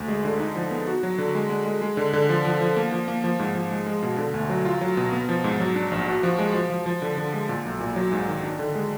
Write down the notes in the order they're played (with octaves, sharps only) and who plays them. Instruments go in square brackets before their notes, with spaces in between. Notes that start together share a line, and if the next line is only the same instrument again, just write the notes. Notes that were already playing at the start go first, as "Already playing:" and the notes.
Already playing: [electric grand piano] D2
G#3
D3
D#4
F3
B3
F#4
F#3
D3
G#3
G#3
G#3
G#3
D3
D3
F3
F3
F3
A#3
F3
A#3
F3
G#2
F3
G#3
G#3
B2
D3
D2
F#3
F4
F#3
B2
B3
F3
G#2
F#3
D4
A#1
F#4
F3
G#3
F3
F3
F3
D3
D3
G#3
A#2
B1
A#2
F#3
G#2
D#3
D4
D3
G#3